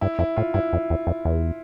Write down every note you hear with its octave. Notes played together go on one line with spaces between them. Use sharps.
G2 E4
F2 E4
A2 F4
G2 E4
F2
E2
F2
E2